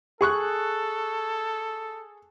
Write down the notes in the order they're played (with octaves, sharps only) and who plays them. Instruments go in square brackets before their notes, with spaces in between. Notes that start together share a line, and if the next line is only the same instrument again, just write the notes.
[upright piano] G#4 C#6 F#6 [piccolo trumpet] A4